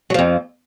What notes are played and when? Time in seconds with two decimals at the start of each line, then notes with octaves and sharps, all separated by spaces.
0.10 F#3
0.14 F3
0.19 F2